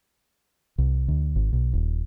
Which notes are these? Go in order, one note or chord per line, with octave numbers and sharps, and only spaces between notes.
C2
D2
G#1
B1
D#1